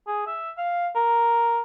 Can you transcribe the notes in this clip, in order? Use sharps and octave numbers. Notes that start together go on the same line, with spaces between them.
G#4
E5
F5
A#4